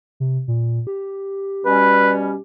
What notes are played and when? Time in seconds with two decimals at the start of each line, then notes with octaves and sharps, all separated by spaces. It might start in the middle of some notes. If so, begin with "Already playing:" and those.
0.20 C3
0.48 A#2
0.87 G4
1.65 B2 G3 C#4 B4